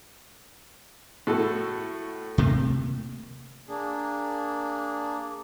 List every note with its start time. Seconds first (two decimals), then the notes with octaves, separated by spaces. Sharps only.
1.27 A2 F#4 A4
2.38 C3 A3 A#3
3.67 A#3 D4 G#4